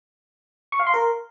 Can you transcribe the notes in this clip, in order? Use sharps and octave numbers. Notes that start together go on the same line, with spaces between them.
C#6
F5
C6
A#4